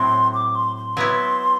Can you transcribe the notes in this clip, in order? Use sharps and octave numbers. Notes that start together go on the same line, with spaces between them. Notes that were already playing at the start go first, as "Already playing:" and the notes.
Already playing: A2 F#3 C4 C6
D6
C6
C6
F#3 B3 E4